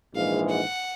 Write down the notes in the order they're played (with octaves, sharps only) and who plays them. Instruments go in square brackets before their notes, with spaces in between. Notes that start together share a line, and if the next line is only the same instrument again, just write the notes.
[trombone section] A#1 G#2 E3 G#3 [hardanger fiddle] F5
[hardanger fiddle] F#5